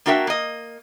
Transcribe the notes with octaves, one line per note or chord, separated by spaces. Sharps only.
A#3 D4 F#4 A#4 E5 G5
A#3 D#5